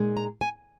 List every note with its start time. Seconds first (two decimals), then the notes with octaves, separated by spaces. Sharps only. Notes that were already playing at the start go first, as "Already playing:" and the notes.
Already playing: A#2 G#3 D#4
0.17 A#5
0.41 G#5